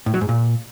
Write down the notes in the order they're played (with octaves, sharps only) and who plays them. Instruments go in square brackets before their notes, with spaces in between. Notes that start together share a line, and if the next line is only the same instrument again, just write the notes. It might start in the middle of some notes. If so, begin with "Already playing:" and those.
[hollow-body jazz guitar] A2
F#3
G#2
A#2